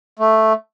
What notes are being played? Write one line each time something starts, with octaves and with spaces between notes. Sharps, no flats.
A3